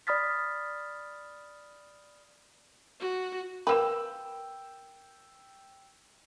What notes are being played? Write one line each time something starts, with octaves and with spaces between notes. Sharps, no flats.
D5 B5 D#6 F6 A6 B6
F#4
A#3 A#4 B4 G5 E6 E7